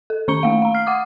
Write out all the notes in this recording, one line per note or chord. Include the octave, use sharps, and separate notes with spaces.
A4
D#3 C#4 C#6 C#7 G7
A3 A#3 F5
F5 A#5
F6 C7
F#5 D6 D#6